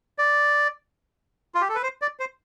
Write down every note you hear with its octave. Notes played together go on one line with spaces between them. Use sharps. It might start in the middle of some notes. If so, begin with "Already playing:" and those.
D5
F4
G4
A4
B4
C5
D5
C5